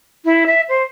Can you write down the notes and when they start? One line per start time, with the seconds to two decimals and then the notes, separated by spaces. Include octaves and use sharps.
0.25 E4
0.46 E5
0.69 C5